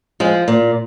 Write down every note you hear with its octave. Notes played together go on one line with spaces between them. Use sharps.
F3 G#3
A#2